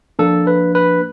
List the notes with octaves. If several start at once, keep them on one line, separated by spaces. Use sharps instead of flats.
F3 A#3 D4 A4
B4
B4